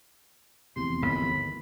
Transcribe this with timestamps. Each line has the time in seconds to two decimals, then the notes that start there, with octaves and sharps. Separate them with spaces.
0.76 F1 E2 C3 C6
1.02 G1 D#2 G#2 B5